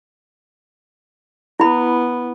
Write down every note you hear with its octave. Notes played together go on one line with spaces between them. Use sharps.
B3 E4 B5